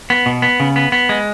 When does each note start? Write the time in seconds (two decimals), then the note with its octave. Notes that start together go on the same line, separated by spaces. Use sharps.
0.10 B3
0.26 B2
0.42 B3
0.60 C#3
0.76 B3
0.92 B3
1.09 G#3